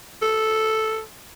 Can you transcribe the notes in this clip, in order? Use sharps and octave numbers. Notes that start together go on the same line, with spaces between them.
A4